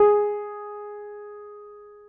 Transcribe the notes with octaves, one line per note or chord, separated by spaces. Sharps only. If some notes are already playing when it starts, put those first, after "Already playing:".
Already playing: G#4